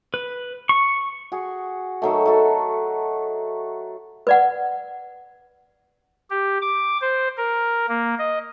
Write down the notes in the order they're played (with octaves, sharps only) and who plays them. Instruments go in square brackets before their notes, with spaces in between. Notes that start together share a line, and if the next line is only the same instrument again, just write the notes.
[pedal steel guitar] B4
C#6
[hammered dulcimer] F#4 G#4
D#3 F#3 A3
A3 F#4 A4
[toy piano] B4 D5 F#5
[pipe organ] G4
D6
C5
A#4
A#3
D#5